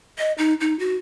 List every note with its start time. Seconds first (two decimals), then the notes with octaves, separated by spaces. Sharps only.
0.18 D#5
0.38 D#4
0.60 D#4
0.79 F#4